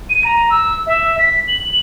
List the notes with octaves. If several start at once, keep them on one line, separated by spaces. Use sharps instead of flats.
D#7
A#5
E6
E5
B6
F#7